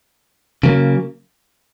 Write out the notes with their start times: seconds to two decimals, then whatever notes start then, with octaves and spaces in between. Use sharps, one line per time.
0.63 C#3 F#3 A#3